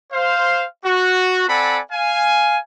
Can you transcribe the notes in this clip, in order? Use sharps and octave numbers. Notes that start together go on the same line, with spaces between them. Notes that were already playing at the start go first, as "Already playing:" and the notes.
C5 F5
F#4
C4 A4 D5 F#5 G#5 B5
F5 G#5